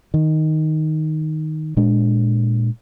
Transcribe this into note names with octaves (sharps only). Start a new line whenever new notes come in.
D#3
A#2 G#3 D4